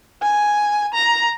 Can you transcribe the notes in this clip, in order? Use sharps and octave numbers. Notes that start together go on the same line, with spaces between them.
G#5
A#5